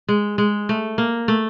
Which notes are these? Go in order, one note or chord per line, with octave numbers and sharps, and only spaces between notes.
G#3
G#3
A3
A#3
A3